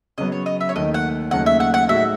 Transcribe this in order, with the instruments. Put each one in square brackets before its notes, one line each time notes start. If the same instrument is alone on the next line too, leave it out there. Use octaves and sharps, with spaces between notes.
[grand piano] C#3 F#3 B3 [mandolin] D#5
[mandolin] C#5
D#5
E5
C#5
[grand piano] D#2 D#3 A3 [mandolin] D#5
[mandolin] F#5
[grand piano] D#2 C#3 F#3 A3 D#4 [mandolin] F#5
[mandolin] E5
F#5
F#5
[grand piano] A2 G#3 D#4 F#4 [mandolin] E5